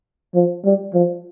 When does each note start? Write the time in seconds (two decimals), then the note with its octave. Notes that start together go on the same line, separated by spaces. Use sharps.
0.35 F3
0.65 G3
0.94 F3